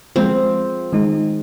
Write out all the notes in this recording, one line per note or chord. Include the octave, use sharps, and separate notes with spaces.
F3 G#3 C4 F4
D#3 G#3 D#4